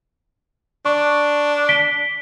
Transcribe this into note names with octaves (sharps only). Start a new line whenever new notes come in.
D4 C#6
B6 D7 G7